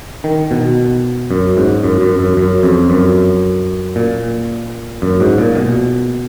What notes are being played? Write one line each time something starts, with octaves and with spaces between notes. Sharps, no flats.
D#3
B2
F#2
G#2
F#2
F#2
F#2
F#2
F2
F#2
A#2
F#2
G#2
A#2
B2